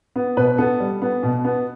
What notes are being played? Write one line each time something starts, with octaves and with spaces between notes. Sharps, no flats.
B3
B2 B4
B3 A4
G3
B3
B2
B3